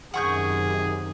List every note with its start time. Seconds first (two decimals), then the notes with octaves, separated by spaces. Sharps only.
0.14 F#2 C3 D#3 G#4 F#5 C#6 G6